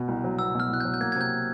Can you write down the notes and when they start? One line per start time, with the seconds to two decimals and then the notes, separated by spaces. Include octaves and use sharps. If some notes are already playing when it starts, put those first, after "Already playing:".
Already playing: B2 B3
0.08 C2
0.24 F#3
0.39 B3 E6
0.55 B2 F6
0.69 C2 F#6
0.80 G6
0.85 F#3
0.94 G6
1.01 A#3 G#6
1.12 C3 G#6
1.21 G6